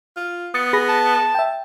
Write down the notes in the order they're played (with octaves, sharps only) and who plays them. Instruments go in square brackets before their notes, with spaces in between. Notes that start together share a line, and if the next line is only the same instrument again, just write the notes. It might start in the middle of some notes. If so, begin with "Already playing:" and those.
[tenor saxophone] F4
[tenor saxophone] B3 [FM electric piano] D#6 A6 C#7
[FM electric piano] G#4 B5 A#6
[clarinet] A5
[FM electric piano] E5 G5